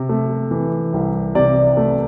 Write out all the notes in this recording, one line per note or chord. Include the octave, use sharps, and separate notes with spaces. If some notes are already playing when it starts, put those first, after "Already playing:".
Already playing: C3
A3
E3
C2
C3 D5
A3